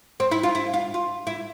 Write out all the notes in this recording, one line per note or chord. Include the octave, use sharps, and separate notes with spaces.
C4
E4
F4
E4
F4
F4
E4